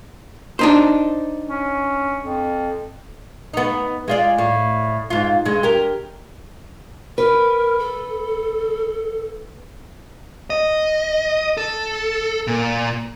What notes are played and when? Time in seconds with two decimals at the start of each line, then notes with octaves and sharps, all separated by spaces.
0.59 D4 D#4 C5
1.49 C#4
2.23 F2
3.54 B3 D#4
4.08 G#3 F4 D5
4.38 A2
5.10 G#2 F4
5.45 G2 G#3
5.63 G4 A#4
7.18 A#4 B4
7.79 A4
10.50 D#5
11.57 A4
12.47 A#2